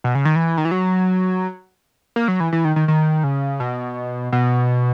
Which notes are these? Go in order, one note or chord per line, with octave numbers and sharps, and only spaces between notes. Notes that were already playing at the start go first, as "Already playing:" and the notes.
B2
C#3
D#3
E3
D#3
E3
F#3
A#3
F#3
E3
E3
D#3
D#3
D#3
C#3
B2
B2